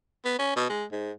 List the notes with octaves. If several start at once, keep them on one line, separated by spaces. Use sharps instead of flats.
B3
C#4
B2
G#3
G#2